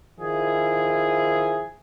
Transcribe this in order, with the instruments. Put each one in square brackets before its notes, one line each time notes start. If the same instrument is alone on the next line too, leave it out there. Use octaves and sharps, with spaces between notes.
[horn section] D#3 F3 E4 G#4